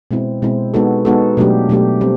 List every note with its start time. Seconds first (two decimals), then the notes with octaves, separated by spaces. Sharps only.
0.11 B2 G#3 C4 E4
0.42 B2 G#3 C4 E4
0.74 G#3 B3 D#4 F#4 A4
1.05 G#3 B3 D#4 F#4 A4
1.37 B2 F#3 A3 D4 G4
1.69 B2 F#3 A3 D4 G4
2.01 G3 C4